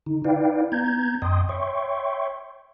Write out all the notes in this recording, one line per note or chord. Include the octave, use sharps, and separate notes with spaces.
D3 D#4
D#4 E4 B4 D5 F5 G5
B3 A#5 G6 G#6
F#2 D#5 G5 C6 D#6
C#5 E5 G5 C6 C#6